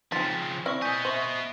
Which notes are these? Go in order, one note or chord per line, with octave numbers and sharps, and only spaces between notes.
C#3 F3 C4 D#4 C6 A6 B6
C4 E4 D5 C#6 F6
B3 D#5 G#5 G6 B6
C5 E5 C#6 F#7